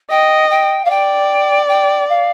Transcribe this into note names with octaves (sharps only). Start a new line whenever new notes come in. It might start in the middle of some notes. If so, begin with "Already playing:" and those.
D#5 G5
G5
F5
D5 G5
G5
F5